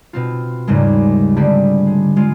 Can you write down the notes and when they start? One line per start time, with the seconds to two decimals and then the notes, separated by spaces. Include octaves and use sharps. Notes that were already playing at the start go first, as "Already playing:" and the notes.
0.13 B2 C4 F4
0.67 D#2 G#2 C#3 G3 G#3
1.37 D3 G3 A3 C4 G4 G#4
1.87 G#3
2.16 G#3 F4